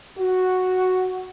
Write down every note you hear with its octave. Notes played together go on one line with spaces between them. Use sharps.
F#4